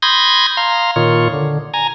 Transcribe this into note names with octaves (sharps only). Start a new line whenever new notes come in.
B5 C6 D#6 G6 G#6 A#6
F5 A#5 C6
A#2 D#3 F4 C#5
D3
G#5 A#5